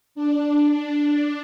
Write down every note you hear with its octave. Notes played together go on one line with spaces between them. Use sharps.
D4
D4